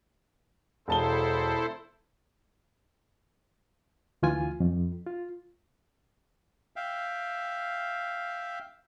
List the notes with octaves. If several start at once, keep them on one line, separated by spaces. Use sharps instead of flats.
E1 E4 A4 C5 A5 G7
D2 E3 F4 G#5
F2
F4
E5 F5 G5